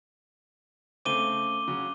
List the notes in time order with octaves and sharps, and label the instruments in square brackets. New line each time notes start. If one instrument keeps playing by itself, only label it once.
[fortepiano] C#3 A3 C4 [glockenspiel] D6 D#7 G7
[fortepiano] C#3 F#3